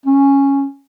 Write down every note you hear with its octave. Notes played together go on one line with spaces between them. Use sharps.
C#4